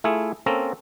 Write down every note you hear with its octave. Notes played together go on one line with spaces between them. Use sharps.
A3 E4 F4 G#4
A#3 C4 C#4 A4 A#5